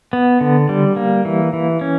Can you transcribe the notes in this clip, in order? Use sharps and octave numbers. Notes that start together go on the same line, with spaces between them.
B3
D3
G3
A#3
E3
E3
C#4